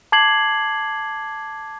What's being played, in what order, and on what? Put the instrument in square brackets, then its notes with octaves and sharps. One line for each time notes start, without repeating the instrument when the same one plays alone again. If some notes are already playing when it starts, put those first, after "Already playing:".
[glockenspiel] A5 D6 G#6 C7 F#7